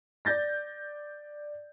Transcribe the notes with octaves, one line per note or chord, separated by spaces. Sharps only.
D5 G6 A6 A#6